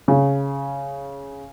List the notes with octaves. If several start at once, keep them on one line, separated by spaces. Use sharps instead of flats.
C#3